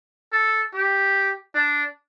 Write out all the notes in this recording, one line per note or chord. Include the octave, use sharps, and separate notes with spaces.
A4
G4
D4